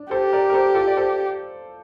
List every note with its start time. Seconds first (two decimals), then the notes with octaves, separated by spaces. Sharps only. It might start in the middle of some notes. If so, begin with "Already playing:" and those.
Already playing: D4
0.11 G4 A4 C5
0.33 A#4 D5
0.50 A#4
0.54 A4 C5
0.75 F4 A4
0.87 D5
0.97 A4 C5